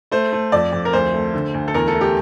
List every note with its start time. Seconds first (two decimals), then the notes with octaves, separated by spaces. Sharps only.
0.11 A3 C5
0.32 A3
0.52 F2 D5
0.72 F2
0.85 A#4
0.93 D2 C5
1.14 A3
1.34 D3
1.54 D2
1.68 A4
1.74 E2 A#4
1.88 A4
1.94 A3
2.01 G4